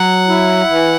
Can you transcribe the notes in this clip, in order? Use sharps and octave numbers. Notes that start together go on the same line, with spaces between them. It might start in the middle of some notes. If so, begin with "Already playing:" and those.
Already playing: F#3 F#5
E4
E3